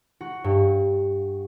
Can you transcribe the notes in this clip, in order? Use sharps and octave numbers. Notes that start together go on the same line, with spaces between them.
F#4
G2